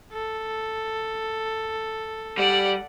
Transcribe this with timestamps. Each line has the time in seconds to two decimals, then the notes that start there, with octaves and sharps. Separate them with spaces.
0.13 A4
2.37 G3 D5 F#5